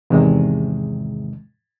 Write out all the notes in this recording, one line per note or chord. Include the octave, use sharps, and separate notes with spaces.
E2 G#2 C3 D#3 G#3